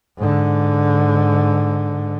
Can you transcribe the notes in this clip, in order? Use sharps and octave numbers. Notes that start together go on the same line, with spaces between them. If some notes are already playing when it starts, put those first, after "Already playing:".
G#2 D3